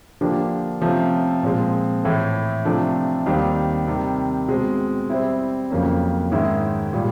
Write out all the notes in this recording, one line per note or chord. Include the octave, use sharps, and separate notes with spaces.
D3 F3 A#3 D4 G4
C3 F3 A3 C#4
A#2 F3 G#3 C4
A2 E3 A3
C3 F3 A3 D4
D#2 D#3 G3 C4 D#4
C3 D#3 G3
B2 G#3 C4
G3 C4 E4
F2 C#3 F#3 A#3 C#4
G#2 D#3 G#3 C#4 E4
A#2 G3